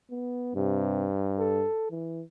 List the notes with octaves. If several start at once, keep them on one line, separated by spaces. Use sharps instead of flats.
B3
G2 C3
A4
E3